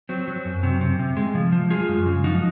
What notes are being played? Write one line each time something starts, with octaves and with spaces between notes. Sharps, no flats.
F#3 C4
F#3
F#2
C3
C3
C3
G#3
F3
F3
G#3 F4 G#4
F#2
C#3
F3 D#4 F#4